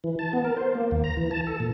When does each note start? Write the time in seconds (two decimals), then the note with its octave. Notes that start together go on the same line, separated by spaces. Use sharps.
0.04 E3
0.19 A5
0.33 B3
0.45 A#4
0.57 C5
0.75 A#3
0.91 D#2
1.04 A#5
1.17 E3
1.31 A5
1.47 A4
1.60 A#2